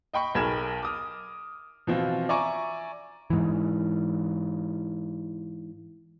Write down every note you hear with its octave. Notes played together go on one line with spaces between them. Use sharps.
D#5 G5 B5 C#6
B1 G#4 A#4 B5 G#6 E7
D6 D#6 F6
B2 E3 F3 C4 F4
D5 E5 G#5 A#5 C#6 D6
G#2 E3